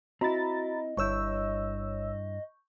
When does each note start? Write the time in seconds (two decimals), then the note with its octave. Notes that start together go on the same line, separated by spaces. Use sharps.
0.21 C4 E4 F#4 D#5 A#5 B5 A6
0.97 G1 G2 E4 C#5 C#6 E6 G6